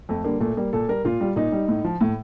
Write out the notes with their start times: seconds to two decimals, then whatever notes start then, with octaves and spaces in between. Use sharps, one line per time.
0.09 F2 A3
0.24 D3 G3 A#3
0.41 A#2 A3
0.57 G3 A#3
0.73 A#2 A4
0.88 G3 A#4
1.05 A#2 F4
1.21 G3
1.36 A#2 D#4
1.52 G3
1.68 A2
1.84 F3
2.01 A2